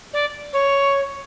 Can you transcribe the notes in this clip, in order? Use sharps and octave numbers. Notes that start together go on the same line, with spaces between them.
D5
C#5